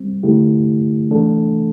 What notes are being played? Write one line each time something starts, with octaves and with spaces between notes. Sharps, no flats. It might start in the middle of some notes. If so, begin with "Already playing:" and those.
Already playing: G3 C4
D3 A3 E4 G4
E3 A3 D4 A4